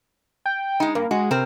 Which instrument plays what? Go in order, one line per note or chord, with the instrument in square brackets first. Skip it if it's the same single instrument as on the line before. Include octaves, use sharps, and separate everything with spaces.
[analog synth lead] G5
[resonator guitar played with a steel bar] G#3 D#4
[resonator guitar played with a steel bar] G2 [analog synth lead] A#3
[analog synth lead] G#3 [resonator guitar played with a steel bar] F#4
[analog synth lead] C3 [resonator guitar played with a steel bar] C4 A#4